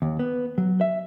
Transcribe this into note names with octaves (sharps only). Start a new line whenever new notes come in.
D#2
B3
F#3
E5